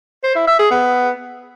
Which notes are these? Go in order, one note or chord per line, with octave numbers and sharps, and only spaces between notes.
C5
E4
E5
G#4
B3